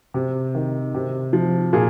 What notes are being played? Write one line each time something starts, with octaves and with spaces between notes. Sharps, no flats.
C3
D#3
C3
F3
A#2 G#4